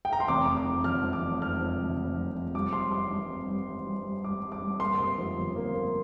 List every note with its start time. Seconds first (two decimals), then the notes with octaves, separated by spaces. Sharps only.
0.05 G5
0.13 A#5
0.20 C6
0.28 F1 D6
0.47 F1
0.57 D6
0.66 F2
0.84 F1 F6
1.04 F2
1.13 D6
1.22 F1
1.41 F2 F6
1.61 F2
1.79 F1
1.97 F1
2.17 F2
2.35 F2
2.54 G3 D6
2.73 C4 C6
2.92 G3 D6
3.11 G2
3.29 C4
3.48 G3
3.67 C4
3.87 G2
4.05 G3
4.24 G3 D6
4.42 G3
4.52 D6
4.62 G2
4.80 A#3 C6
4.99 C3
5.18 F2
5.37 G1
5.56 A#3
5.74 A#3